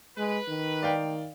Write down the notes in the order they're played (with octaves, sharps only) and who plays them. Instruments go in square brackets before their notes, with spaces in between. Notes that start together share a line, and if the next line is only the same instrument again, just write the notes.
[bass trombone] G#3 [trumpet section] B4
[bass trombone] D#3
[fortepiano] D5 F5 G5